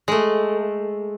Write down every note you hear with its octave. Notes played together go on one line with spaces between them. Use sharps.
G#3 A3